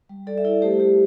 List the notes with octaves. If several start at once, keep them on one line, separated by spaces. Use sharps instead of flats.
G3
G3 A4 D5
E5
E4 A4 D5
A3 G4 C5
A3 G4